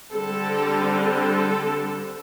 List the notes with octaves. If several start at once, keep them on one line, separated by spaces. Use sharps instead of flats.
D3 G3 C4 A4
A4